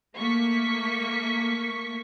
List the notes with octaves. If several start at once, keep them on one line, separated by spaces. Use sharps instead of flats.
A3 A#3 C#6 B6